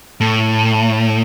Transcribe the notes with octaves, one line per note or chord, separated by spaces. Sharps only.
A2